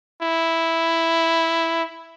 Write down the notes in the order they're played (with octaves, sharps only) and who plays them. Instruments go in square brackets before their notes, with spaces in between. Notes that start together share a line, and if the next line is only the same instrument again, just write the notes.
[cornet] E4